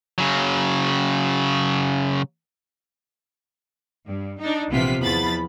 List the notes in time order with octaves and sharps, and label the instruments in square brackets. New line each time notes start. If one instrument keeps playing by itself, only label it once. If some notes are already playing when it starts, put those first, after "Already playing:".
[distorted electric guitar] C#3 F#3
[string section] G2
D4 D#4
A#1 C3 E3 B3 F4 B6
E2 F3 B5 A6